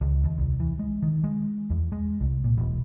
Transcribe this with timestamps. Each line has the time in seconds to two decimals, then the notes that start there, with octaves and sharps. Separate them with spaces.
0.01 C#2
0.24 D#2
0.38 C2
0.60 E3
0.79 G#3
1.02 D#3
1.24 G#3
1.70 E2
1.92 G#3
2.21 C2
2.44 A#2
2.57 E1